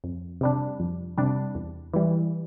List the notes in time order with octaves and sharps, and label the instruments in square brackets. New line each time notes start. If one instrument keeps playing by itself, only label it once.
[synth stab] F2
C3 G3 D4
F2
C3 G3 D4
E2
E3 G3